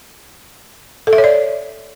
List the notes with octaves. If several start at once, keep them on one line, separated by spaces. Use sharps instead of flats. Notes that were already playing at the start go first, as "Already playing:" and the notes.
A4
E5
C#5
D5